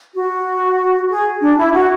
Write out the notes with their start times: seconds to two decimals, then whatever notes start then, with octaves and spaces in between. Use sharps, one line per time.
0.13 F#4
1.09 G#4
1.41 D4
1.57 E4
1.73 F#4